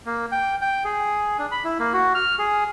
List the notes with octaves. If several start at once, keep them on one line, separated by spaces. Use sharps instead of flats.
A#3
G5
G5
G#4
D4
B5
E4
A#3
F#4
F6
G#4